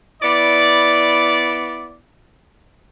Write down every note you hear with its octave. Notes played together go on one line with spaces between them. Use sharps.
B3 E4 D5